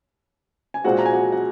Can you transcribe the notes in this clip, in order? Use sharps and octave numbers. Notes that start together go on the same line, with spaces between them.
G#5
A#2 G#3 C4 F#4 F#5
A#5
G#5
F#4 F#5
F#5